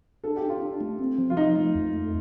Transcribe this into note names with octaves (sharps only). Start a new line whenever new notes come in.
D4 A4
G4
D4
F4
D4
A3
C4
F3
F4
F3 D#4
A3
F2
A3